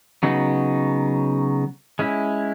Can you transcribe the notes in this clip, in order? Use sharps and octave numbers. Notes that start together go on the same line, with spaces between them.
C#3 F#3 B3 D#4
G#3 C#4 E4